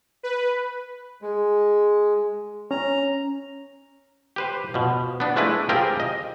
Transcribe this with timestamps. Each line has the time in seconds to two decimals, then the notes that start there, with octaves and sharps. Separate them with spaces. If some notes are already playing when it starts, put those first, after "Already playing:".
0.23 B4
1.22 G#3
2.71 C#4 A#5
4.36 G4 B4 C5
4.74 B2 F3
5.20 B3 D4
5.36 F3 G#3 A3 D4 E4 B4
5.69 C4 F4 G4 G#4 A#4
6.00 D#5